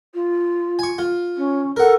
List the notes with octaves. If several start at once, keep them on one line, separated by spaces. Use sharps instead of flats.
F4
G#5 C#6
F4
C#4
A4 A#4 F#5